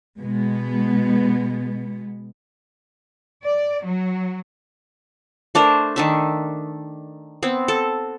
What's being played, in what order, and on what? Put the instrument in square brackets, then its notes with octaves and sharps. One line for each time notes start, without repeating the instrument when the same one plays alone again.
[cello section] B2 G#3 B3
D5
F#3
[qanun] A3 D4 A#4 C5
D#3 D4 E5
B3 C4
A4